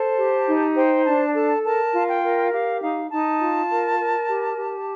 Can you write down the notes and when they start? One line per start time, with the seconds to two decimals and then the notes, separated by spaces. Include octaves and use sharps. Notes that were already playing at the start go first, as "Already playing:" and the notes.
Already playing: A4 C5 A5
0.17 G4
0.47 D#4
0.76 C5 G5
1.05 D4 A5
1.34 A4 A5
1.64 A#4 A5
1.94 F4
2.08 G5
2.23 A#4
2.52 G4 F5
2.81 D#4 F5
3.11 D#4 A5
3.41 F4
3.70 A#4
4.00 A#4
4.29 G4
4.58 G4